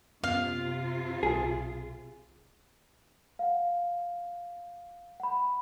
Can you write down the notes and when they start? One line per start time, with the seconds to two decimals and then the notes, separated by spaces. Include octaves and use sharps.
0.24 F#2 C3 B3 C#4 F4 F5
1.23 B1 G#4
3.39 F5 F#5
5.20 F#5 B5